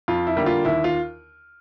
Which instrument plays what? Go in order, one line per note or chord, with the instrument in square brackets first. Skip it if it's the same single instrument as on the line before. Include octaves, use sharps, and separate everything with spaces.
[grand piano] F2 F4
E4
D3 G3 A#3
F4
D#2 E4
F4